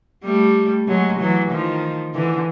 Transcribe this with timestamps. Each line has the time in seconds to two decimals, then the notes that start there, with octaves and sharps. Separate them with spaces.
0.24 G3 A3
0.88 F#3 G#3
1.20 E3 F#3
1.50 D#3 F3
2.14 D3 E3